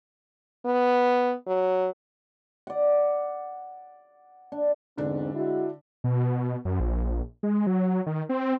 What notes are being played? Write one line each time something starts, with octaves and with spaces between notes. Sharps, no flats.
B3
F#3
D5 F#5
D4
E2 G#2 D3 C4 D4
G#3 E4 F#4
B2
F#2
A#1
G#3
F#3
D#3
C4